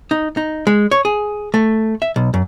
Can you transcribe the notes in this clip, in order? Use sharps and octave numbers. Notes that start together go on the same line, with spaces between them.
D#4
D#4
G#3
C#5
G#4
A3
E5
B1
F#2